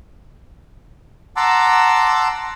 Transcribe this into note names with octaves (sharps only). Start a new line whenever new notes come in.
F#5 A5 A#5 C6 D6 E6